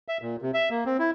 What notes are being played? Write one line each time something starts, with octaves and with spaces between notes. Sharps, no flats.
E5
A#2
C3
E5
A#3
C4
E4